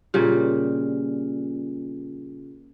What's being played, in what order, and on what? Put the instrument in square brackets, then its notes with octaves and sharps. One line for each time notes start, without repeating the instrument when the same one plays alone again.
[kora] A#2 C#3 G3